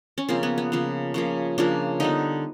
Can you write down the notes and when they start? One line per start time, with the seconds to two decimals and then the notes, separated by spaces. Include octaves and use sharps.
0.18 C#4
0.29 C#3 F3 A#3 C4
0.43 B3
0.58 B3
0.72 C#3 F3 A#3
1.14 C#3 F3 A#3
1.58 C#3 F3 A#3 D4
2.00 D3 G3 B3 D#4